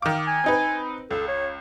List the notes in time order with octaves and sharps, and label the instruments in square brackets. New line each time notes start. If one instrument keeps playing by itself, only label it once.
[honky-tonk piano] D#3 D6 [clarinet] F5
[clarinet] G#5
[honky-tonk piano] C4 D#4 B4
[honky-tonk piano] C#2 [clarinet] A4
[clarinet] C#5